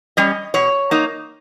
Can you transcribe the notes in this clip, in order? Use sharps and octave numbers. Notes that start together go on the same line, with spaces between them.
G3 C#4 D#5
B2 C#5
A#3 D#4